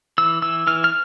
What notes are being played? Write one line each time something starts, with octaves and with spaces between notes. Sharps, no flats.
E3 E6
E3 E6
E3 F6
F6